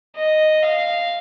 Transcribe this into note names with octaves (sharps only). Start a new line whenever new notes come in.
D#5
F5